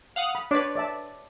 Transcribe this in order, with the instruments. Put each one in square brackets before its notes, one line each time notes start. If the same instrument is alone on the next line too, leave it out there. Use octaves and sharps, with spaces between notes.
[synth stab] F5 F#5 D#6
[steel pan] B5
[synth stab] D4 B4 [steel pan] C#5 D5
[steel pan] D5 E5 A5